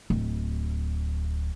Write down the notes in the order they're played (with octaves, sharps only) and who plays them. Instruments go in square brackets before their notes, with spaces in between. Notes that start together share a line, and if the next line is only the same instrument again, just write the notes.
[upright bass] D1